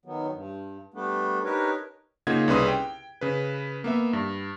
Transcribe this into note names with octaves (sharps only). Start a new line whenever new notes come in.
D#3 F#3 B3
G2
G3 A3 B3 D4
D4 D#4 G4 A#4 B4 C#5
C#3 A#3 D#4 F4 F#5 G#6
C2 C#4 G#4 B4 C6 D#6
G5
C#3 B4
A#3 B3 E5
G2